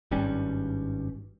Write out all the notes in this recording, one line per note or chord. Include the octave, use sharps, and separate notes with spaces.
G#1 G2 G3 C#4